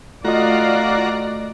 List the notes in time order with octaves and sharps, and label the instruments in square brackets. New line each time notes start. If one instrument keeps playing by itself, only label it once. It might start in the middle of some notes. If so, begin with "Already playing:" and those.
[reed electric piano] A3 D#5 [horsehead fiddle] F4 F5 [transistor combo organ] F#4 A#5 [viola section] D5